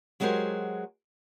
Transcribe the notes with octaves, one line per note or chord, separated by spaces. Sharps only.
F#3 G#3 F#4 G4 A#4 C5